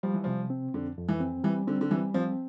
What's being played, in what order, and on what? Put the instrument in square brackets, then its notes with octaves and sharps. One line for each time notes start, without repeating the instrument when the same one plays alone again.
[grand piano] F3 [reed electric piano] G3
[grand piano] E3
[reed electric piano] C3 [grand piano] F3
[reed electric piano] C4
[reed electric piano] F2 [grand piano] D3
[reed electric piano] F2
[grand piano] E3
[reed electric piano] C4
[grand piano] E3 [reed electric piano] G3
[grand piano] D3 [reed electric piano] C4
[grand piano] D3
[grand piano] E3 [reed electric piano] G3
[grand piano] F3 [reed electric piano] C4